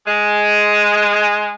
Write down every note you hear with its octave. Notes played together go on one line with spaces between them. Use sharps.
G#3